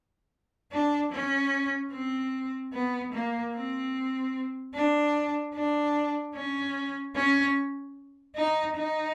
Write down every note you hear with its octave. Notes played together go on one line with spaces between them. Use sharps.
D4
C#4
C4
B3
A#3
C4
D4
D4
C#4
C#4
D#4
D#4